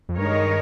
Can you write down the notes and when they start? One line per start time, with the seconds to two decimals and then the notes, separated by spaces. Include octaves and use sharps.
0.09 F2
0.17 G2 D#3 G#3 D#4 A#4 C#5